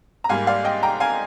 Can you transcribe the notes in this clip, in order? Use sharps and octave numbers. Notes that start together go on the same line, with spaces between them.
A#5
G#2 G3 A#3 F5 G#5
D5 F5
D#5 G5
G5 A#5
F5 G#5